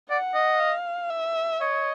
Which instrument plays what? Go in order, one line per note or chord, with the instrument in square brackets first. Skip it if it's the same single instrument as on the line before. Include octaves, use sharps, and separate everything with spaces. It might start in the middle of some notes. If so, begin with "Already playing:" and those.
[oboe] D5 [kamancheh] F#5
[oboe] D#5
[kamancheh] F5
E5
[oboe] C#5 [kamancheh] D#5